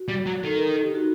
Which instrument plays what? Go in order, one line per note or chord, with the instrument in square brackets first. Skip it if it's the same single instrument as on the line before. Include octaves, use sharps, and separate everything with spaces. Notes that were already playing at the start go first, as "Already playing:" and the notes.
Already playing: [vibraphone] F#4
[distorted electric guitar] G3
F#3
[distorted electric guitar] D#3 [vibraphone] A4
[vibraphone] A#4
A4
G4
D#4
F#4